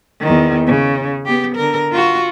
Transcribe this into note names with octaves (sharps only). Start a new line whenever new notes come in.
E2 D#3
C#3
B3 G4
D3 A#4
F4 F#4